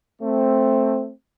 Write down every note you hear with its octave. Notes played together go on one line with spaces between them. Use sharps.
A3 C4